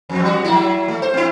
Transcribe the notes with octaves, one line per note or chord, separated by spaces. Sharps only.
F2 C4
G3 F#4
F#3 A3 E4
A3
C5
C4 E4